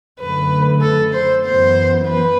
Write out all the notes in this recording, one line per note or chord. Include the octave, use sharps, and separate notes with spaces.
F#2 D3 A3 B4
A4
C5
F#2 E3 B3 C5
B4